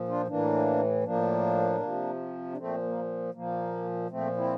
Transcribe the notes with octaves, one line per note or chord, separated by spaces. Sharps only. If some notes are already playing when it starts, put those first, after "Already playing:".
Already playing: A#2 F3
D4 F4
A2 E3 A#3 D4
A2 F3 A#3 D4
C3 F3
D4
A#2 F3 A3 C4
A#3
A#2 F3 A#3
A#2 F3 A3 C4
C4 E4